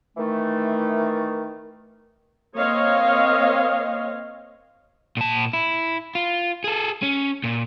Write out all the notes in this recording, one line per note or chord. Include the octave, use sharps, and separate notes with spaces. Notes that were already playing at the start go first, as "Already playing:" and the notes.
D#3 E3 A3
A#3 C4 C#5 D#5 F5
A#2 A5
E4
F4
G#4 A4
C#4
A#2